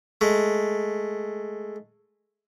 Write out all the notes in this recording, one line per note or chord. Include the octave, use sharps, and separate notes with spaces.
G#3 A3